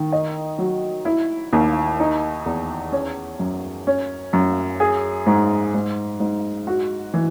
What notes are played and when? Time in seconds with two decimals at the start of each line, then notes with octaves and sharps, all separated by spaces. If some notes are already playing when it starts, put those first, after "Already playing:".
Already playing: D#3
0.12 D#5
0.58 F#3
1.05 E4
1.53 D#2
2.00 D#4
2.46 E2
2.92 C#4
3.39 F#2
3.87 C#4
4.33 F#2
4.80 G#4
5.27 G#2
5.74 G#2
6.20 G#2
6.67 F#4
7.14 E3